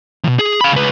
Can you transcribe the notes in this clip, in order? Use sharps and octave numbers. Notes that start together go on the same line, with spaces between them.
E2 B2
G#4
F5 B5
C#2 B4